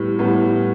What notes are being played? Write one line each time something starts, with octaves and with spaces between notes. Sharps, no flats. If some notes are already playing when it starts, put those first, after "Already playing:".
Already playing: A2 G3 B3
A2 G3 B3